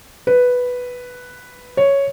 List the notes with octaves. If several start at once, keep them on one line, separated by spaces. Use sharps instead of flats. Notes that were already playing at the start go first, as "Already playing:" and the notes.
B4
C#5